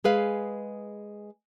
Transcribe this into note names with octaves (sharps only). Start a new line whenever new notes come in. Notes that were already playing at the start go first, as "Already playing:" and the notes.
G#3 G#4 B4 F5